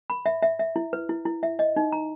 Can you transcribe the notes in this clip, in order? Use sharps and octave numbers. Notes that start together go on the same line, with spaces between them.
B5
E5
E5
E5
E4
B4
E4
E4
E5
D#5
D#4
A#5